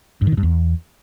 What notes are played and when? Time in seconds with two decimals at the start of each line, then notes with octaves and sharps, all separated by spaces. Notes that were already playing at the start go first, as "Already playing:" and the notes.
0.22 G2
0.27 D#3
0.32 A#2
0.38 G2
0.43 E2